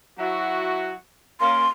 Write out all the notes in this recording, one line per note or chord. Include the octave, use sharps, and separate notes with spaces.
F#3 E4 F#4
A#3 C#4 C6